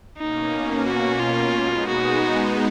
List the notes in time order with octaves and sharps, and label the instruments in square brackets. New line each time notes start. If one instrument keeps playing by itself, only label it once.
[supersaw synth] B2 A#3 C#4 [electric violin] D#4
[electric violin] F#4
F4
[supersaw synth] G#3 B3 D#4
[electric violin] F#4